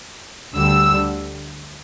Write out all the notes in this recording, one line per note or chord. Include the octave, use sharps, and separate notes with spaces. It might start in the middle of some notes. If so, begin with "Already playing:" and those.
D2 D3 G3 E6